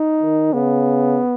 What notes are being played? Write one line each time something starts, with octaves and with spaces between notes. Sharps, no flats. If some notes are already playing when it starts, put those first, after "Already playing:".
Already playing: D#4
D#3
C#3 B3